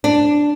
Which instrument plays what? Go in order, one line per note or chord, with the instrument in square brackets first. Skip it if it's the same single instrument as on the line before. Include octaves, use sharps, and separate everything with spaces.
[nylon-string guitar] D4